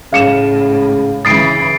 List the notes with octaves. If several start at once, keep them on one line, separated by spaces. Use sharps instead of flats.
A2 C#3 F5 C#7 E7
C#3 E3 D#6 A6 C7 D7